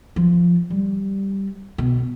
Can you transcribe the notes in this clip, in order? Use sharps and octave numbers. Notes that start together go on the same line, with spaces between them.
F3
G3
B2